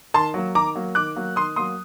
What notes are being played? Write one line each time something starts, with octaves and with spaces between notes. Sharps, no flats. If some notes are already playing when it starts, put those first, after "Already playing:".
D#3 A5 C6
F#3 A#3
D#3 A#5 D6
F#3 A#3
D#3 D6 F#6
F#3 A#3
D#3 C6 D#6
F#3 A#3 C6 D#6